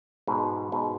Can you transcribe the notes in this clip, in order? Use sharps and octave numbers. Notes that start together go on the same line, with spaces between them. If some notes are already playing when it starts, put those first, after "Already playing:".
G#2 B2
G#2 B2